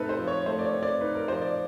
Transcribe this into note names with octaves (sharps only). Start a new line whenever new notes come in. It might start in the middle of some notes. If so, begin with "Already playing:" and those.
Already playing: A3 C4 D#4 A4 B4
C5
F3
C#5
A3 C5
D5
C#5
C4
D5
D#4 B4
A#4
F3 C5
D5